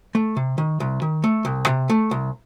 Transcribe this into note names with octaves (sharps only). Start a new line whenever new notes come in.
A3
C3
D#3
C2
D#3
A3
C2
C3
A3
C2